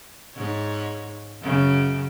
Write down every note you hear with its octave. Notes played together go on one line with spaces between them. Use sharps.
G#2 C#5
F#2 C#3